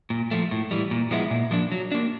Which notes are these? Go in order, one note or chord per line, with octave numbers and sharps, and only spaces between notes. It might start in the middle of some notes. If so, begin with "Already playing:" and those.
A#2
F3 A3
A2
E3 G3
A#2
F3 G#3 B3 E4
A#2
F3 A#3 D4
F#3
A#3 D4